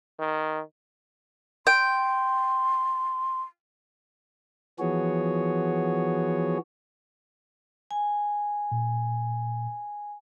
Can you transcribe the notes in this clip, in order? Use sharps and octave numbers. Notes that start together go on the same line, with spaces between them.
D#3
G5 C6
E3 F3 B3 F#4 G#4 C#5
G#5
A#2